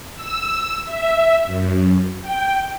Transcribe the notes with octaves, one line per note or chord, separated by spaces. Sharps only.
E6
E5
F#2
G5